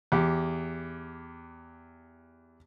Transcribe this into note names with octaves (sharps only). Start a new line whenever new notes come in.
E2 G4